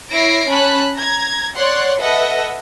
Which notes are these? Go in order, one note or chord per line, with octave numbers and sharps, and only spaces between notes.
E4 C#5 A#6 C7 D7
C#4 A5 B5 F#6
A#5 G#6
C#5 D5 F#5 C6 F#6
A4 B4 D#5 E5 F#5